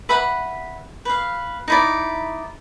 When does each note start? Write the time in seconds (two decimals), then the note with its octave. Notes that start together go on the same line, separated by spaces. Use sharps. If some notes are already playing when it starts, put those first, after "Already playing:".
0.09 B4 E5 F#5 B5
1.05 B4 F5
1.68 D#4 E4 D5